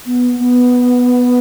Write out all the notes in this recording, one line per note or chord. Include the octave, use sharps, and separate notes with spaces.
B3
B3